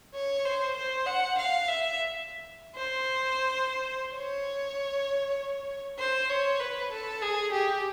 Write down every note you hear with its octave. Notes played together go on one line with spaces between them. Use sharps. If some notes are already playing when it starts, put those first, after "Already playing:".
C#5
C5
C5
F#5
F5
E5
C5
C#5
C5
C#5
B4
A4
G#4
G4